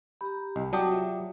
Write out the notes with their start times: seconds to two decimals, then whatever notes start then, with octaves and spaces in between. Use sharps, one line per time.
0.21 G4 A#5 B5
0.56 C2 D#5
0.73 F#3 F#4 G4 D5 A5 D#6
0.87 F4 C#5 E5